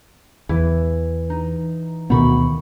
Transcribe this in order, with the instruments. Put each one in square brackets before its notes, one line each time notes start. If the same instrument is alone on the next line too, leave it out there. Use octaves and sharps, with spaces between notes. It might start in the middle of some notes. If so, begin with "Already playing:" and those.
[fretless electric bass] E2 [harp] E3
[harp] D#4
[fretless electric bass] D2 B2 B3 [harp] D#3 B5 C#6